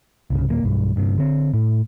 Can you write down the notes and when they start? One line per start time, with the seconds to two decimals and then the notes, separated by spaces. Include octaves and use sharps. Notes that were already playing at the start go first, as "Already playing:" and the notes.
0.30 C2 G2 C#3
0.49 D1 G#3 A#3
0.63 B1 G2
0.96 G1 G2 C3
1.18 D3 C4
1.54 A2